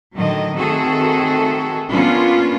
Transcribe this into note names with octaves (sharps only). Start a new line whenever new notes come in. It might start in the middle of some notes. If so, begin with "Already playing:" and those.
A2 D3 D#3 F#3 D#5
D#3 A3 C4 F#4 G#4 A4
A#3 B3 C#4 D4 F4